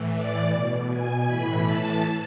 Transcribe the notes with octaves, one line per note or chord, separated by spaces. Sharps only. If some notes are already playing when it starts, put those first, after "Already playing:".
Already playing: A2 E3
D5
B2
G#5
A2 E3 B5
A5